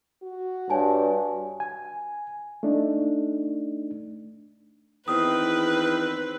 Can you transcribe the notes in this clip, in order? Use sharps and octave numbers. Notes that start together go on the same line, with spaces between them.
F#4
G2 C#5 G#5 A5
G#5
A3 D4 D#4
E2 D#3 C4 B4 D#6